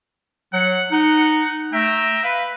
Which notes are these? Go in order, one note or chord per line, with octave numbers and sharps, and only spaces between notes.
F#3 F#5
D#4 F#5
A3 E5 G5 A#5
B4 F5